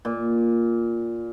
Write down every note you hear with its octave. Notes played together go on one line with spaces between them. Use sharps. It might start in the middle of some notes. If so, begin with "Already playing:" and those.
A#2